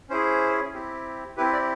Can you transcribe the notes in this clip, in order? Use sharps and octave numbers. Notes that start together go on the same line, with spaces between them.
C#4 E4 G#4 C5
C4 E4 G4
C4 E4 G4 B4
D5